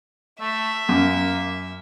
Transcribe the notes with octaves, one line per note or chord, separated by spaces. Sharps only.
A3 E5
F#2 A#3